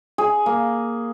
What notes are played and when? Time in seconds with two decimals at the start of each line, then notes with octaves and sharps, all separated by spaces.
0.18 G#4
0.46 A#3